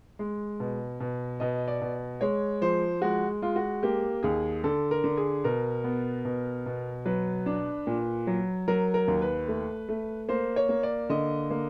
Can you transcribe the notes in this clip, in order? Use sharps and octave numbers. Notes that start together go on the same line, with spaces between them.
G#3
B2
B2
B2 D#5
D5
B2
G#3 C#5
F3 C5
G#3 F#4
G#3 F4
F#4
A#3 G4
D#2 G#4
D3 A4
A#4
D3
G#4
B2 A#4
B3
B2
B2
F#3 B4
D4
A#2
F#3
F#3 A#4
A#4
D#2
B4
A3
A3
A#3 C5
C#5
A#3
D5
D3 D#5
A#3